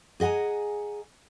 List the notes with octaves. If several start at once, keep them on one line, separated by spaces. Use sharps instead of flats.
G#4 D#5 F#5 G#5 A#5